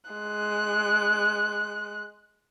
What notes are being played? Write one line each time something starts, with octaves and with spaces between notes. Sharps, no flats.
G#3 F#6